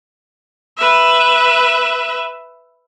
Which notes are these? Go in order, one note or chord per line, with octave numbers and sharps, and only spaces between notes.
B4 E5